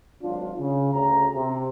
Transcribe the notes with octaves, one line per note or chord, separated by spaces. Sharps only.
G#1 F#3 D4 F4
C#3
D2 C#3 A#5
C3